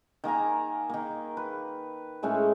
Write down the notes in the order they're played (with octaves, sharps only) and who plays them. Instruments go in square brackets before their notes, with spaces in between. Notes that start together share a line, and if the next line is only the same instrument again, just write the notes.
[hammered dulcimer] D#3 A#3 G#5 A#5
D#3 A#3
B4
A2 G#3 A3 C#4